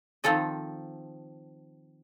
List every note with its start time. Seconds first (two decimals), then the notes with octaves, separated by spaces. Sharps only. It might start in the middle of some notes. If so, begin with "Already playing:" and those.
0.24 D#3 F3 C4 A4 D#5